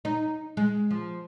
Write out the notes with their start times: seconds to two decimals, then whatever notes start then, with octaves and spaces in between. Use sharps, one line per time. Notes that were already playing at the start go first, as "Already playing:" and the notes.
0.05 D#4
0.57 G#3
0.91 F3